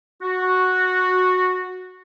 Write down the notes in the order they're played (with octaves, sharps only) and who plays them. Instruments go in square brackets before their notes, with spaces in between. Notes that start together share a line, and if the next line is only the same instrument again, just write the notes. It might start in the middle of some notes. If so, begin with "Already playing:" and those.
[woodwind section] F#4